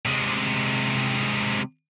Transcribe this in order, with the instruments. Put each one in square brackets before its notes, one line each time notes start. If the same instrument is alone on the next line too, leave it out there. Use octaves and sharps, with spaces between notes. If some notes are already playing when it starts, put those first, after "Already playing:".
[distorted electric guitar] C3 G#3